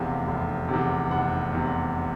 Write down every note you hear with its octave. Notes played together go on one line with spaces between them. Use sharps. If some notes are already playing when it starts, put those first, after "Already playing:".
Already playing: F1 E2 C3 F5
F1
E2 C3
F1 F#5
E2 C3